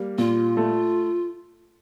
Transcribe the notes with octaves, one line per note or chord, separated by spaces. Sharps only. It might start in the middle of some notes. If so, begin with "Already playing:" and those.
Already playing: G3 A#3
A#2 F4
A3